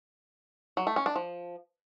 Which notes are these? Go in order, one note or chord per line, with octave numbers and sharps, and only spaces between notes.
F#3
A3
C#4
D4
F3